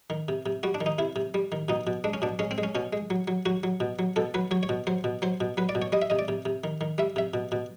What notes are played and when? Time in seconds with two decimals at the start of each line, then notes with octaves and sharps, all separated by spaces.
0.10 D#3
0.28 C3
0.46 C3
0.63 G3 F#4
0.75 D4
0.81 D#3
0.86 D#4
0.98 C3 E4
1.16 C3
1.34 G3
1.52 D#3
1.69 B2 D#4
1.87 B2
2.04 G#3 D4
2.14 C#4
2.22 B2 D4
2.39 G#3 C#4
2.51 C4
2.58 G#3
2.63 C#4
2.75 B2 C#4
2.93 G#3
3.10 F#3
3.28 F#3
3.46 F#3 F#4
3.63 F#3
3.80 B2
3.99 F#3
4.16 B2 A4
4.34 F#3 B4
4.51 F#3 C#5
4.63 C#5
4.69 B2
4.87 F#3 C5
5.04 B2
5.22 F#3 C5
5.41 B2
5.57 F#3 B4
5.69 D5
5.75 B2
5.82 C#5
5.92 G3 D#5
6.02 E5
6.10 C3 D#5
6.19 D5
6.28 C3
6.45 C3
6.64 D#3
6.81 D#3
6.98 G3 E5
7.16 C3 E5
7.34 B2
7.52 B2